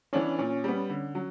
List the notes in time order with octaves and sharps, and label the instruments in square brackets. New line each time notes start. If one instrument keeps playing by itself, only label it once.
[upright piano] E3 B3 D4 [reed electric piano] C#4
[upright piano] A#2 [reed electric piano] C#4
[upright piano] G3 B3
D3
F#3